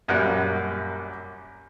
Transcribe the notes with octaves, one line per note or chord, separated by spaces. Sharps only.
A#1 F#2 G3 A#4 F#5